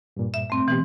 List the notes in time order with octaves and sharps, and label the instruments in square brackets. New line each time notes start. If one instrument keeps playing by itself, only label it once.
[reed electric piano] G2 A#2
[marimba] E5
A3 C4
[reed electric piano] B2 B3 G4 [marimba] E3